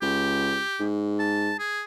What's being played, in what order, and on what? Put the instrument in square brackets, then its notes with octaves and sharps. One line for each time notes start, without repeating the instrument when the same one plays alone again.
[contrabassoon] C#2 [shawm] G4
[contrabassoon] G#2
[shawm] A5
G#4